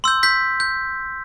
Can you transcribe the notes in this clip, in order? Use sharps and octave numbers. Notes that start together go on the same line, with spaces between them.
C6 E6 G6
G6 B6
G6